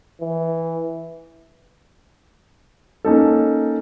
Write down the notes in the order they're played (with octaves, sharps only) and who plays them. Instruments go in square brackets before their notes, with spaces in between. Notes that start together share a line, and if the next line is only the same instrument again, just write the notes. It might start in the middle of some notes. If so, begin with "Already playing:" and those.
[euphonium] E3
[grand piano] A#3 C#4 D#4 A4